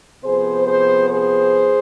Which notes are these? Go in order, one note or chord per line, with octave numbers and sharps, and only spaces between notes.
C3 F3 B3 G#4 C5
G#4 C5
G#4 C5